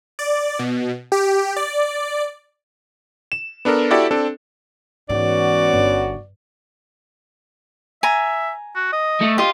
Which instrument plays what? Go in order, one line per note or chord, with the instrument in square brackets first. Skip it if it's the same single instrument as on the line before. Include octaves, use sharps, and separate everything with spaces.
[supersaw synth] D5
B2
G4
D5
[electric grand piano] E7
B3 D4 A4 A#4
E4 F#4 G4 A4 D5
C4 D4 A4
[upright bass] G#2 E3 [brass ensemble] B3 C#4 F#4 [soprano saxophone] D5
[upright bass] G1
[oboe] E5 [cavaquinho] G#5 A#5
[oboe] F#4
D#5
[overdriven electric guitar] A3
[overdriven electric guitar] F4 [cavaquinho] G4 D#5